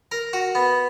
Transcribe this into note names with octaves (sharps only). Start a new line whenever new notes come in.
A#4
F#4
B3